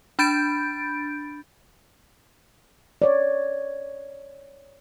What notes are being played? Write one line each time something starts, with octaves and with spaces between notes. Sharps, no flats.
D4 B5 G6 A6 D7
C#5 D5